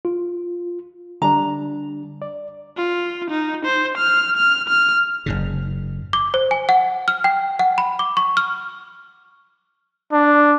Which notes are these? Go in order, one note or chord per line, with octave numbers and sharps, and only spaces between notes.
F4
D3 G3 D4 A#5
D5
F4
D#4
C5
F6
F6
F6
F#1 G#2 C#3
D6
C5
G#5
F#5
F6
G5
F#5
B5
D6
C#6
F6
D4